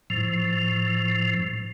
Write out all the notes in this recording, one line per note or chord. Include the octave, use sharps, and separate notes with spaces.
A2 F3